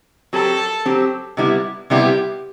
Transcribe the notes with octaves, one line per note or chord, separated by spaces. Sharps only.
F#3 C4 G4 A4
F#3 C4 G4
C3 G3 B3 E4
C3 G3 B3 E4 G4